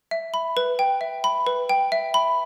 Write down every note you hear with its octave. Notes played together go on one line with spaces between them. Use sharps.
E5
B5
B4
G5
E5
B5
B4
G5
E5
B5